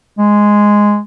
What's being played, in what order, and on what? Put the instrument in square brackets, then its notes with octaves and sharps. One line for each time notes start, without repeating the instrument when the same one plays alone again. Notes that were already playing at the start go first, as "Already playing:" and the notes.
[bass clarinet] G#3